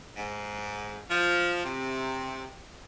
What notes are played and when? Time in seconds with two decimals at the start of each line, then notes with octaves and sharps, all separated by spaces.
0.17 G#2
1.10 F3
1.63 C3